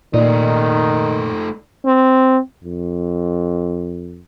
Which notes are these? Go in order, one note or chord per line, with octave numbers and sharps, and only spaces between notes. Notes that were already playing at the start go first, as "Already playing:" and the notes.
A#2 D#3 A3 D#4 D5
C4
F2